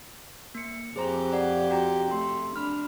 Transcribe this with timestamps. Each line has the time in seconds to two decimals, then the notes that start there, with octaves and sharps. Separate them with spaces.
0.55 A#3 C#7
0.96 F2 G4 G#4 C5 A#5
1.33 D5 F#5
1.70 F#4 G5 A#5
2.11 A3 C6
2.56 D4 B5 F6